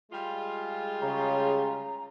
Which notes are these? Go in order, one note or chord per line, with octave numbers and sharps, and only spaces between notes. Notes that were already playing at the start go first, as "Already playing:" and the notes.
G3 G#3 F4
C#3 A#5